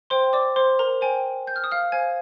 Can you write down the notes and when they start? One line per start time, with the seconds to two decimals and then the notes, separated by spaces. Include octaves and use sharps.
0.10 C5 G5 C6
0.33 D5 D6
0.56 C5 C6
0.79 A#4 A#5
1.01 C5 G5 G#5
1.47 G6
1.56 F6
1.64 D#6
1.71 F5 F6
1.92 C5 F5 G#5 G#6